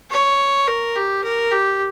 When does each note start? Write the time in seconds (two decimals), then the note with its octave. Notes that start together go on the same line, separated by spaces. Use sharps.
0.11 C#5
0.67 A#4
0.95 G4
1.24 A#4
1.51 G4